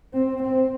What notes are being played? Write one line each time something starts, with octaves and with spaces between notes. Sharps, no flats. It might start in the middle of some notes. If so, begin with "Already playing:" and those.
C4
C4